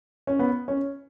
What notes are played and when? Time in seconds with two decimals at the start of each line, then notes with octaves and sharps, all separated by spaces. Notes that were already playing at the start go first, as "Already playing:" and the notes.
0.27 C#4
0.39 B3
0.68 C#4